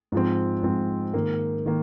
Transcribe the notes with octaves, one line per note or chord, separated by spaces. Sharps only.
G#2 F3 C4
G#2 F3 C4
G#2 D#3 A#3
D#3 A#3